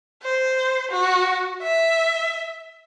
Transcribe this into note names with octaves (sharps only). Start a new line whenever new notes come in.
C5
F#4
E5